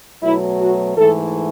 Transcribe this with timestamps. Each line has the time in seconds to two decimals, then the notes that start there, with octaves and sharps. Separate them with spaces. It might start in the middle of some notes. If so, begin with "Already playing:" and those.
0.23 B2 F#3 A3 E4
0.60 F#4
0.97 G#2 E3 A3 A4